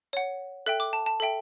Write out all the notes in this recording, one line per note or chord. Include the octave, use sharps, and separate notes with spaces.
C#5 F#5
A4 E5 G5 F#6
D6
A5
A5
A4 E5 G5